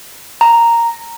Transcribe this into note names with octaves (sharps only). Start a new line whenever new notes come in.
A#5